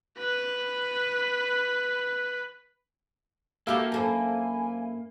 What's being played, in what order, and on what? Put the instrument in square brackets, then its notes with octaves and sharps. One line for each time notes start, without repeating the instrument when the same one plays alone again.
[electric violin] B4 B5
[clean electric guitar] A#3 [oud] F#4 G4 A4 [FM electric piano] E5 F5 B5
[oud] F#2 A4 C5 [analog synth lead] G#5